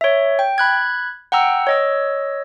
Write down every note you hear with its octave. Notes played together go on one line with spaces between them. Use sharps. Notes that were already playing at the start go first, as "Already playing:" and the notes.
C#5 E5
G5
B5 F#6 G#6
F#5 G5 A#5 E6
C#5 D#5 E6